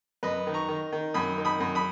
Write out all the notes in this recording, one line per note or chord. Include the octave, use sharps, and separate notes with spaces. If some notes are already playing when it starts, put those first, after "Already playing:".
F#2 B4 D#5
D#3
A#5 C#6
D#3
D#3
F#2 B5 D#6
D#3
B5 D#6
F#2
B5 D#6